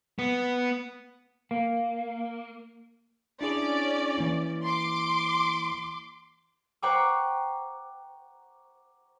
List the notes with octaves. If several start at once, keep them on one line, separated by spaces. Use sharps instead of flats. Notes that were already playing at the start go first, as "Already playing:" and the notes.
B3
A#3
C#4 D4 E4 G#4 D5
E3 A#3 E4
C6 D6
C5 F#5 G5 A#5 C#6 D6